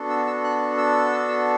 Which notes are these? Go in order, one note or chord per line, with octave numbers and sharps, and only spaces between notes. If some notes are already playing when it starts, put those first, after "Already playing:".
Already playing: B3 D4 F#4 A4
E6
E6
F#6
E6